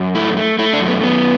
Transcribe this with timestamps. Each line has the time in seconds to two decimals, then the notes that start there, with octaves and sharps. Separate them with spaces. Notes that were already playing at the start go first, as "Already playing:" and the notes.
Already playing: F#2
0.15 A3 E4
0.37 A3
0.59 A3 E4
0.73 D4
0.81 F#2
0.88 B3
1.03 F#2 B3